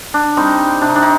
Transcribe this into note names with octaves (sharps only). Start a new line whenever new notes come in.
D4
G3 C4 D#4
C3 D4
D#4
D4
D#4